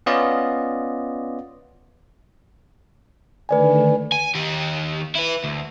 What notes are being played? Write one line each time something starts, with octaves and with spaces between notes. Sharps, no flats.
B3 C#4 F4 D5 D#5
D3 D#3 A3 B4 D5 G#5
G#5
D#3 G4
E4 B4
D2